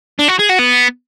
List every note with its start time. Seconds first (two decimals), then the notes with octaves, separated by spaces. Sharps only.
0.19 D4
0.28 F#4
0.39 G#4
0.49 F#4
0.59 B3